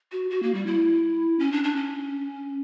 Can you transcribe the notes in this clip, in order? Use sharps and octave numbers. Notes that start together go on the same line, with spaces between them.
F#4
F#4
A#3
G3
E4
C#4
D4
D4
C#4